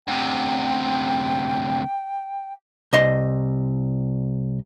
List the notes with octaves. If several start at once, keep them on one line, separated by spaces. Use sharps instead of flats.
D2 C3 G5
C2 D#5 C6